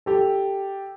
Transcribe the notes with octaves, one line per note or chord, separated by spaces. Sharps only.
G4 A4